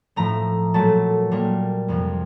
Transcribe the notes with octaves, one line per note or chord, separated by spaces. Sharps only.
A2 F3 A3 A#5
A#2 F#3 A3 A5
A#2 G3 A#3
F2 C3 F3